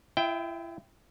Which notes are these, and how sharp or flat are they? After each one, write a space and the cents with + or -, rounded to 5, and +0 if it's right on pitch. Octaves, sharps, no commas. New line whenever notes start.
E4 +40 E5 -25 G5 +0